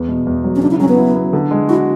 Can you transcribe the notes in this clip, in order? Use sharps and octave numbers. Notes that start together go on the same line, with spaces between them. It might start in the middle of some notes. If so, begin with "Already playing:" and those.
Already playing: E2 B3
B2
E2
F#3
C#4
C#3 D4
E4
F#3 C#4
B3
E4
B3
D3
G#3
E4 F#4